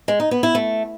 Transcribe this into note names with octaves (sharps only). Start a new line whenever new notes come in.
G#3
D#4
B3
E4
A3